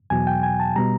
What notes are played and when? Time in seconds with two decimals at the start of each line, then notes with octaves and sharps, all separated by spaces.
0.10 E2 B2 F#3 G#5
0.27 G5
0.43 G#5
0.60 A5
0.76 B2 G3 A#5